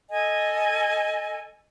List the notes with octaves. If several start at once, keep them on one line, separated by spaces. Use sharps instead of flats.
A4 D#5 G#5